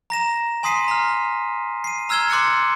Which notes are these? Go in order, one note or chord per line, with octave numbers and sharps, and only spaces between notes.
A#5 A#6 E7
G#5 C6 D#6 B6 C7 D#7
A#5 F6
C7 D#7
A#5 E6 F6 G#6 E7 G7
C6 D6 F#6 A6 C#7